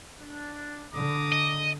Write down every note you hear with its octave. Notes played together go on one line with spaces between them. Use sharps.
D4
D3 A#5 D6 D#6
D#5